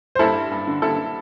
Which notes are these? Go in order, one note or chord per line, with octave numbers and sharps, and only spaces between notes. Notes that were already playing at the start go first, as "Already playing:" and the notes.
C5
G2 E4 A4
G3
G2
D3
G2 E4 A4
D3